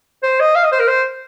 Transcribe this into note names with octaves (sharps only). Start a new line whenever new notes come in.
C5
D#5
F5
D#5
C5
A#4
C5